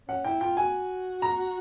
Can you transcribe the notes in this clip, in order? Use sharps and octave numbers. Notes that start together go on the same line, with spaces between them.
C#4 F#5
E4 G5
F4 G5
F#4 G#5
A#5